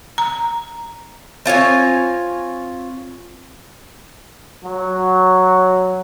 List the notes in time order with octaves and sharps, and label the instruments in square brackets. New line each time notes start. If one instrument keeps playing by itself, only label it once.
[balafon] A#5
[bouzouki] C4 F4 C#5 G#5
[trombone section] F#3